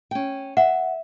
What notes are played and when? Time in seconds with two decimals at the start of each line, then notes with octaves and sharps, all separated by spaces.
0.11 C#4 G5
0.57 E5 F#5